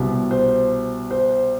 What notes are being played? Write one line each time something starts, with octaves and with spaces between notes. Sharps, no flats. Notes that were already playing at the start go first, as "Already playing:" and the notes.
Already playing: C2 B2
C5
C5